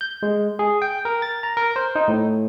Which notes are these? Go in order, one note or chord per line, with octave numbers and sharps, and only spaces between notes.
G6
G#3
G#4
G5
A#4
A6
A#5
A#4
C5
D#4
A2